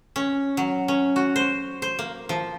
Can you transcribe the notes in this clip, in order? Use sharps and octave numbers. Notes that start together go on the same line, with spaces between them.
C#4
F#3
C#4
F#4
C5
C5
A#3
F3